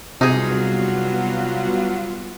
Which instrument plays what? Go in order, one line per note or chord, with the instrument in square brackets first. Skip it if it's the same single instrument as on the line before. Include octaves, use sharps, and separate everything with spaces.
[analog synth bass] C3 [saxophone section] F#3 F4 [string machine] G3 B3 F#4 [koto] D#4 G#4